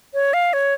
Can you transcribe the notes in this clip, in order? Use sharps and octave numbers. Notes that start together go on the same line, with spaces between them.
C#5
F5
C#5